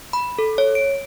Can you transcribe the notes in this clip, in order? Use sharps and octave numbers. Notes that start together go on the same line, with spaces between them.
B5
A4
C#5
D7